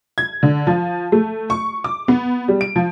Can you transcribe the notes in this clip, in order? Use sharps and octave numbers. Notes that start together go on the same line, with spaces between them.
G#6
D3
F3
A3
C#6
D6
B3
G3
D7
F3